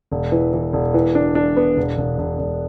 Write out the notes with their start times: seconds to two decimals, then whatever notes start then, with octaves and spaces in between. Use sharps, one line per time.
0.12 E1
0.32 E3
0.53 E3
0.73 E1
0.94 E3
1.15 D4
1.35 D4
1.57 B3
1.77 E1
1.97 E1
2.18 E1
2.39 E1